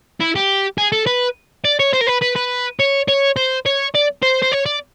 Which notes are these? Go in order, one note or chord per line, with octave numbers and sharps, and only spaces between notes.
E4
G4
G#4
A4
B4
D5
C#5
C5
A#4
B4
B4
B4
C#5
C#5
C5
C#5
D5
C5
C5
C#5
D5